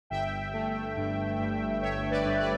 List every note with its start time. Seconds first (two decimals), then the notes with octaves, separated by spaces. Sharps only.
0.10 G1 E5 G5
0.53 A3
0.97 G2
1.39 G2
1.82 G1 C#5 E5
2.11 B4 D5
2.25 G2
2.40 B4 D5